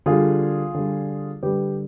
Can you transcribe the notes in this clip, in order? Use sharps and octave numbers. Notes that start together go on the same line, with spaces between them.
D3 G3 F4 G#4
D3 G3
D3 G3 G4 B4